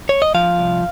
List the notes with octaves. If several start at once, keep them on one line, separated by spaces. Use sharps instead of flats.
C#5
D#5
F3 F5
C2